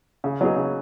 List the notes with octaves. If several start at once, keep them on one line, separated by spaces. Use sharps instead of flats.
C#3
F#3 B3 D#4 G#4
C#3